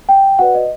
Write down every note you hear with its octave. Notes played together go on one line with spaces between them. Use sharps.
G5
F#4 B4 D5 F#5
D#5